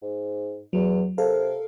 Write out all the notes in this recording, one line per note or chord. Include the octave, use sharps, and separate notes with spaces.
G#2
E2 F#3
C3 A4 A#4 F5